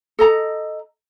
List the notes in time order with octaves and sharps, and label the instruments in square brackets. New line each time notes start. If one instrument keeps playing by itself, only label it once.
[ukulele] A4 D#5 A#5